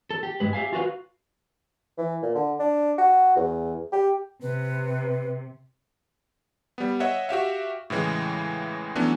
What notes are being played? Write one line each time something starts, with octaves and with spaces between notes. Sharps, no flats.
A4
G4
G2 G#3 B4
G4 E5 F5 G#5
F4 F#4 B4 F5
E3
A#2
D3
D4
F#4
E2
G4
C3 B4
G3 B3
C#5 D#5 E5 F#5
F#4 G4 E5 F5
A2 C#3 E3 G#3
E3 F#3 A3 B3 C#4 D4